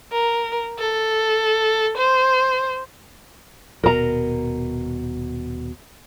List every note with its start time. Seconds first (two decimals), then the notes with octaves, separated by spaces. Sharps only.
0.12 A#4
0.79 A4
1.97 C5
3.84 D#1 B2 A#4 A#5